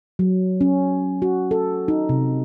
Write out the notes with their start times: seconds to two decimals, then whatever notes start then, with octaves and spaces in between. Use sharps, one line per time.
0.19 F#3
0.61 C#4
1.22 F#4
1.51 A4
1.88 D#4
2.09 C3